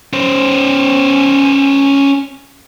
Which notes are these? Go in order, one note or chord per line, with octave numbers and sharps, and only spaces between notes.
C#4 C5